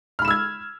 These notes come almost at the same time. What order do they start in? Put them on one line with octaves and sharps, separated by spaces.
F6 B5 E7 E6 G#6